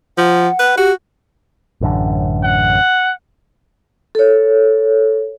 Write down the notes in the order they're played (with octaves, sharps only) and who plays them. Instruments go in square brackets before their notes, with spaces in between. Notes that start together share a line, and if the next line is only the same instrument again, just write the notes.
[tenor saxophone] F3 [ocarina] F#5
[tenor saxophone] B4
[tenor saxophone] F#4 [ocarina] G4
[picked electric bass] A1 F#2 D3
[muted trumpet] F#5
[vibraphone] A4 C#5